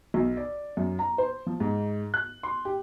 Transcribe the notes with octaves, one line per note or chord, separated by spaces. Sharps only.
B1
D5
F#2
A#5
C5
F3
G#2
F#6
C6
G4